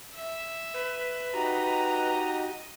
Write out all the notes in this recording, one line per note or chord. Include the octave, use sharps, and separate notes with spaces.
E5
B4
D#4 F#4 G4 D#5 A#5